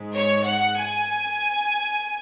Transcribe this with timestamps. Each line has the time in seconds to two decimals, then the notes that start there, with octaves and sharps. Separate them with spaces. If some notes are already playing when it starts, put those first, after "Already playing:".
Already playing: G#2 G#3
0.15 C#5
0.46 F#5
0.77 G#5